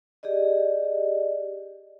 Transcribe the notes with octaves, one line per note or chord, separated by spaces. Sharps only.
G4 G#4 D5 D#5